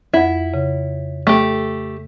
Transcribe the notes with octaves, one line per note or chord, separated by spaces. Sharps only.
F2 E4 F#5
C#3
A3 G4